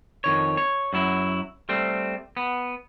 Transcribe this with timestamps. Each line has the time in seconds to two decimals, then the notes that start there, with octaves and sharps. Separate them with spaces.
0.24 F2 D#3 C#5
0.57 C#5
0.93 F#2 F#3 E4
1.69 G3 A3 C4
2.37 B3